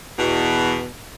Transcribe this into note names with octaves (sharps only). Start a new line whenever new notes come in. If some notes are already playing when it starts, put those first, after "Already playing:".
E2 B2